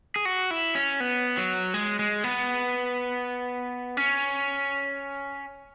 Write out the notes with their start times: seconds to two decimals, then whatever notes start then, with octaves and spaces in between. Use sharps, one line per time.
0.16 G#4
0.25 F#4
0.51 E4
0.75 C#4
1.00 B3
1.37 F#3
1.74 G#3
1.99 G#3
2.24 B3
3.97 C#4